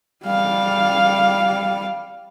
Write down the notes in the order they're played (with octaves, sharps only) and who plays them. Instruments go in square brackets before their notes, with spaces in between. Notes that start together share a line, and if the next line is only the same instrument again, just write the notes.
[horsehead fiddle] G3 F5